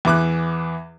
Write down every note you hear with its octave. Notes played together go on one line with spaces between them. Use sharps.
E2 E3 D6 F#6